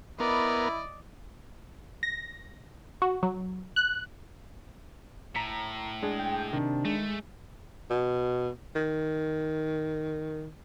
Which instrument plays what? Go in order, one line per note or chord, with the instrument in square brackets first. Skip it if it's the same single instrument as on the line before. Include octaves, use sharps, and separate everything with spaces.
[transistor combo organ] B3 A#4 [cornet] E4 [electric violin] D5 D#5
[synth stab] A#6
F#4
F#3
F#6
[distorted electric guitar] A2 [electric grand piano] A#5 B6 C#7
[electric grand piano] G#3 D4 G#4
[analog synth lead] G5
[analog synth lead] C3 [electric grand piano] D#3 [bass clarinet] D4
[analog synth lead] G#3 [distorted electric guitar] A3
[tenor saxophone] B2
D#3